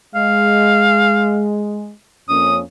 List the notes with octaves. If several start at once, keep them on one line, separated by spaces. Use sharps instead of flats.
G#3 F5
F2 A#3 C#4 D#6